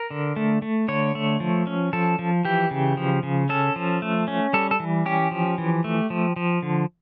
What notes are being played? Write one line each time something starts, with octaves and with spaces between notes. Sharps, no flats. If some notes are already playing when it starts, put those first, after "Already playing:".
Already playing: A#4
D3
A3
A3
D3 C#5
A3
F3
C#4
F3 A4
F3
E3 G4
C#3
F3
C#3
C#4 A4
F3
A3
C#4
G3 A4
A4
E3
C#4 G4
F3
E3
A3
F3
F3
D3